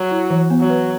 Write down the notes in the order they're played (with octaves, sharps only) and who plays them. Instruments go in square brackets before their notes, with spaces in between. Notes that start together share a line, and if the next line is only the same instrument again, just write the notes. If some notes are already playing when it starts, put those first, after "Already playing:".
Already playing: [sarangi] F#3
[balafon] E4
E3
B3
[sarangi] F#3
[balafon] B4